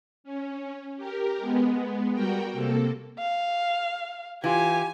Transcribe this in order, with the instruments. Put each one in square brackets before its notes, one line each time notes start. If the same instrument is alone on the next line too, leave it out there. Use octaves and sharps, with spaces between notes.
[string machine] C#4
G4 A#4
G#3 B3
G3 F#4 A#4 G5
C3 A#3 A4
[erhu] F5
[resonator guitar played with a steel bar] E3 F4 [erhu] G4 [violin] G#5